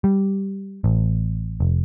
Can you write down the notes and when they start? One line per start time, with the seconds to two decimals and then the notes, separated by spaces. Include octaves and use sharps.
0.04 G3
0.84 A1
1.60 F1